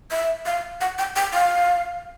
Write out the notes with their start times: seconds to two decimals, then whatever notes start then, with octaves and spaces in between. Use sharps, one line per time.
0.11 E5
0.46 F5
0.81 F#5
0.98 G5
1.16 G5
1.34 F5